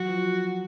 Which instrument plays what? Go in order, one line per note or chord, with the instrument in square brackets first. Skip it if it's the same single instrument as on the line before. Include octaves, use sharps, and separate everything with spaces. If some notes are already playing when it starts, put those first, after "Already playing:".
Already playing: [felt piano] F#3 [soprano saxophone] F#4
[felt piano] F3